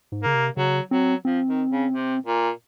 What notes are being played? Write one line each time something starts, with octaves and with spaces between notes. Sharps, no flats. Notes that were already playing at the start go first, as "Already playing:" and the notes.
G#2
C#3 A#3
C3
C#3 F#3
F#3 C4
F3 C4
D#3
C#3
C3
A#2